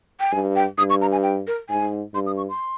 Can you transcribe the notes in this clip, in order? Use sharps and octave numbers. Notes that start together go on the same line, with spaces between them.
G5
G2 G#5
G5
G2 D#6
C#6
A#5
G#5
G5
A#4
G#2 G#5
G2 C6
D#6
C#6
C6